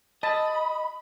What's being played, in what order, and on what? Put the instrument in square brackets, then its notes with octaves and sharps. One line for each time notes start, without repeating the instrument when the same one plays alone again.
[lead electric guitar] D#5 [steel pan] A5 [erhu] B5